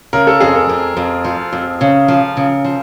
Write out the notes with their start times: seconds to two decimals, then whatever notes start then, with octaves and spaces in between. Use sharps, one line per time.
0.13 C#3 A#4
0.27 A4
0.40 F2 G#4
0.55 A4
0.69 F2
0.97 F2
1.24 F3
1.53 F2
1.81 C#3
2.08 F3
2.37 C#3
2.65 F3